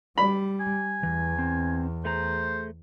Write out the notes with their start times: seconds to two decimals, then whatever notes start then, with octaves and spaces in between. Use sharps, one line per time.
0.18 G3 B5
0.60 G#5
1.03 E2 E3
1.39 C4
2.05 A3 G#4 C5 A#5